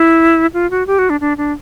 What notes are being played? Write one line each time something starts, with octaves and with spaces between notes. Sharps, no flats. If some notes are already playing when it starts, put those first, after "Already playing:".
Already playing: E4
F4
F#4
G4
F#4
D4
D4
D4